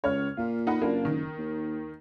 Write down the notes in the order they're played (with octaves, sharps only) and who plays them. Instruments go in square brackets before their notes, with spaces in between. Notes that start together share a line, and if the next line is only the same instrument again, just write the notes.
[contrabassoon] C#2 [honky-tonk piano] C#5 F6
[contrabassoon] A#2 [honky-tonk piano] F4
[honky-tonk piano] D#4 F#5 B5
[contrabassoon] F#1 [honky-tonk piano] A#3 D4 F4
[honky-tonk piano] D#3
[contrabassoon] D#2